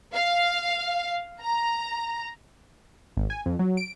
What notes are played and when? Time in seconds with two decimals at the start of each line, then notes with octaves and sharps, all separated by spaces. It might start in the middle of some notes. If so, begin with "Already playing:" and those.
0.13 F5
1.41 A#5
3.17 G#1
3.30 G#5
3.46 F2
3.59 F#3
3.77 D7